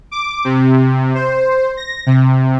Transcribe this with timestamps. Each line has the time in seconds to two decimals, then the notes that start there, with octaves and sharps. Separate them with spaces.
0.11 D6
0.44 C3
1.15 C5
1.77 A#6
2.06 C3